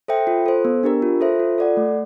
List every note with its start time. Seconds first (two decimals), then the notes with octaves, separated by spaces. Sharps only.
0.08 A4 C5 E5 G5
0.27 F4
0.46 A4 C5
0.65 B3
0.83 D4 G4 A#4
1.02 F4
1.21 A4 C5 E5
1.40 F4
1.58 A4 D5 F#5
1.77 A3